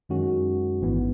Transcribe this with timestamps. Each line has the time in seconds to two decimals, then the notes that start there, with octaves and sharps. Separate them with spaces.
0.09 F#2 D#3 G#3 C#4 F#4
0.81 A1 G#2 E3 B3